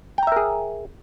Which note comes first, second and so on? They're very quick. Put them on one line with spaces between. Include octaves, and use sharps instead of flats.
G5 A#5 E5 A#4 G#4